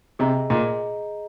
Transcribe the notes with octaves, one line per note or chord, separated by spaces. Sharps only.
C3 G#4 D#5 A#5
A#2 G#4 D#5 A#5